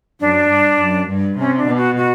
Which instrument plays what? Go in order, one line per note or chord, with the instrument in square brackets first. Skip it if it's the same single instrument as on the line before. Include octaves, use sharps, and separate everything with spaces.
[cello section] F#2 [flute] D4
[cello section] G2
F#2
G2
[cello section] C3 [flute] C#4
[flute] D4
[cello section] B2
[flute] F#4
F#4